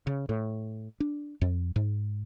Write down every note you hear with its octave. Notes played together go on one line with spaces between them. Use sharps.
C#3
A2
D4
F2
G#2